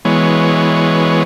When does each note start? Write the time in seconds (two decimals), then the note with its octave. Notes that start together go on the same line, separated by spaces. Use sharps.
0.05 E3 G#3 B3 C#5